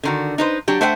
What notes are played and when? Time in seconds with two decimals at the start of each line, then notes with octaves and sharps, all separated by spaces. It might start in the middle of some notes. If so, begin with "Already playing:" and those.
0.03 D3 D#3 F#4
0.38 D#4 B4 C5
0.68 F#3 D4 G4
0.81 A3 D4 C5 E5 F#5 G5